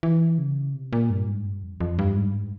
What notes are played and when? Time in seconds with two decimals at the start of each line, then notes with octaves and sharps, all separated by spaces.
0.03 E3
0.38 C#3
0.74 C3
0.93 A#2
1.10 G2
1.27 G#2
1.45 G2
1.63 F2
1.80 F2
1.99 G2
2.16 G#2
2.27 G2
2.34 G#2